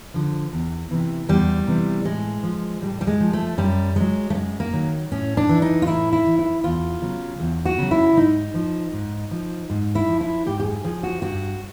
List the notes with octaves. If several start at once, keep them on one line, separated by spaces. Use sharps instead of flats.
D3 F3
E2
C3 E3
E2 G3
C3 E3
A2 G#3
F3
A2 G3
G3
G#3
F3
A3
F#2 G3
D#3 F#3 G#3
A3
F#2 G#3
A#3
D#3 F#3
A2 C#4
D4
E3
D#4
F4
A2 E4
E4
E3
E4
E2 F4
C#3 F#3
E2
F#4
C#3 F#3
E4
G#2 D#4
F3
G#2
F3
G#2
E4
F3
E4
G#2 G4
G4
G#4
F3 G#4
F#4
G2 F#4